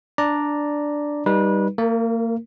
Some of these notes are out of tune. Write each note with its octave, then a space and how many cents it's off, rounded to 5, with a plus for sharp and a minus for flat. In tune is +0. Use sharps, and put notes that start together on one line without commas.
D4 +0 D5 +0 A#5 +0
G3 +0 D#4 +0 B4 -25
A#3 -35 A#4 +5